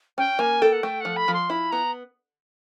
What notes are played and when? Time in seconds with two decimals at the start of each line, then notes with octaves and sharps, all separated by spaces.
0.18 C#4 G5
0.39 A#3 G#5
0.62 A4 G5
0.73 F#5
0.83 A3 G5
1.00 F3 F#5
1.16 B5
1.28 F3
1.34 C6
1.50 E4 B5
1.71 B3 A#5